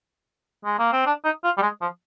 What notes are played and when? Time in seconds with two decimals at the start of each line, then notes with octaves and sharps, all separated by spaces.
0.65 G#3
0.79 A#3
0.92 C4
1.06 D4
1.24 D#4
1.44 F4
1.57 G3
1.62 G#3
1.81 F3